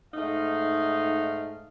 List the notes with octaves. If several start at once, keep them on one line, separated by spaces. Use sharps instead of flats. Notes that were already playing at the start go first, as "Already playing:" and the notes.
G#2 A3 D#4 F5